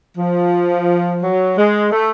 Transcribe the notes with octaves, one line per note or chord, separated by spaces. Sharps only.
F3
F#3
G#3
A3